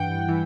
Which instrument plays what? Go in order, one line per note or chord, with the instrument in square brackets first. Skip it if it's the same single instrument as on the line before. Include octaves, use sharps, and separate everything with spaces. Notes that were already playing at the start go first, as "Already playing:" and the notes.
Already playing: [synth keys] G2 E3 F#5 G5
E3